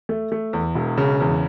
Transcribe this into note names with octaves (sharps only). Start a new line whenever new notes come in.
A3
A3
E2
E1
C#3
E2